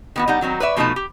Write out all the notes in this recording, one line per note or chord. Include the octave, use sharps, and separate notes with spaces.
D#3 B3 F#4
G3 D#4 F#5
D#3 F#3 C4 D#4
B4 C#5 D5 E5
B2 F3 A3 B3 D#4 A5
G4